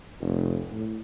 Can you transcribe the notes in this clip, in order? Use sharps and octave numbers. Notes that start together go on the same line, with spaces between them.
F1
A2